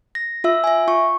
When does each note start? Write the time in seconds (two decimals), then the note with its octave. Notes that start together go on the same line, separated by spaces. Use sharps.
0.15 A#6
0.44 F4 E5 E6
0.64 E5 G#5
0.88 F4 C#6